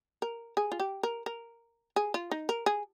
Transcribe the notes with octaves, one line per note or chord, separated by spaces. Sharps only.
A#4
G#4
F4
G4
A#4
A#4
G#4
F4
D#4
A#4
G#4